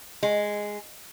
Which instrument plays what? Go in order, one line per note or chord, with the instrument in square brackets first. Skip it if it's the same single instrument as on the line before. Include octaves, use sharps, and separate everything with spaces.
[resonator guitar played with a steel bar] G#3